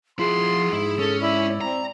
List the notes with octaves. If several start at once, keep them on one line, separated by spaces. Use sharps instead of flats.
F3 E4 F#4 G#4 C6
G#2 E4
C#4 A4
E4 D5
C4 A#5